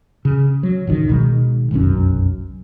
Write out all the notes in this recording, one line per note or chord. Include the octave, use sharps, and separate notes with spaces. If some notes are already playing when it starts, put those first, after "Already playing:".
C#3
F#3
G#1 C#2 D#3
B2 D#3 G#3
F1 B1 F#2 C#4